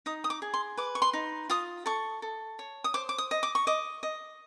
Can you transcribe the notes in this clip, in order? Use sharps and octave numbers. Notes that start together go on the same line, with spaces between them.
D#4 D#6
D#6
D6
G#4
C6
B4 D6
C#6
C6
D#4
F4 D#6
A4 C#6
A4
C#5
D#6
C5 D6
D6
D#6
D#5
D6
C#6
D#5 D6
D#5